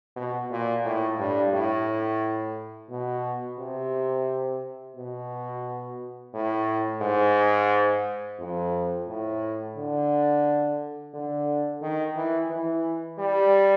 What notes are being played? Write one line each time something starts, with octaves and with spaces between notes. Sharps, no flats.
B2
A#2
A2
G2
A2
B2
C3
B2
A2
G#2
F2
A2
D3
D3
D#3
E3
E3
G3